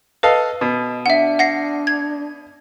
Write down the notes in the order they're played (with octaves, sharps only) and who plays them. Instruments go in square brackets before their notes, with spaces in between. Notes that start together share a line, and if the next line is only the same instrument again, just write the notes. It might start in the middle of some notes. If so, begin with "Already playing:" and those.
[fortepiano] A4 D#5 F5 [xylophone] B4
[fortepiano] B2
[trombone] D4 [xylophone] E5 F#5
[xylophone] F#5 A#6 C7
G#6